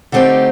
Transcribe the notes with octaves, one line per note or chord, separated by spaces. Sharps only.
D3 A3 C4 D#4 G4